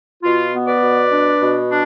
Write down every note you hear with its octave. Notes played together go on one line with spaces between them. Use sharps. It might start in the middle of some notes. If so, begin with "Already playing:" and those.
B2 F4
B3
B4 D5
B2
D4
B2
D4